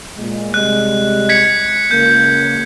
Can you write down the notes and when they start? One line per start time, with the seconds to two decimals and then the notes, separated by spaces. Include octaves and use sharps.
0.17 A#2 G#3
0.54 C3 G3 G#3 F#6
1.29 G#6 B6 C#7
1.91 C#2 A#3 G6